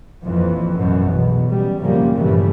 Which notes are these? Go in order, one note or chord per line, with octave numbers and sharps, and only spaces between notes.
A#1 F2 E3 F3
A1 F#2 B2 E3
B1 E2 B2
C#3 G3
F#2 C#3 F3 G3 A#3
G2 A#2 C#3 E3 G3 A3